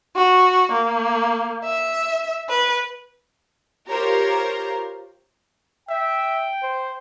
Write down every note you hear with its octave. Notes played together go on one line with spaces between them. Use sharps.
F#4
A#3
E5
B4
F4 G4 A#4 C5 C#5 A#5
E5 G5
C5